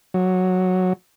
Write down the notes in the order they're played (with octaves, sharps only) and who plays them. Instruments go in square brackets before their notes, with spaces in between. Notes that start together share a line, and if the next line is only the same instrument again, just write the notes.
[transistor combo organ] F#3